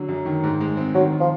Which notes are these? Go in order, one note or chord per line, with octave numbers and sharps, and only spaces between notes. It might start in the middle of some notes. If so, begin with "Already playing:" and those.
Already playing: D3 F#3
F#2
D#3
G#2
G#3
C4
D#3 F#3
D#3
F3